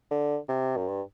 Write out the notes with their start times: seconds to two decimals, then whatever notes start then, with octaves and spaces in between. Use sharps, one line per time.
0.11 D3
0.49 C3
0.76 F#2
0.88 G2